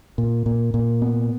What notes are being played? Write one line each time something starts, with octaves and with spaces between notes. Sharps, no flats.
A#2
A#2
A#2
B3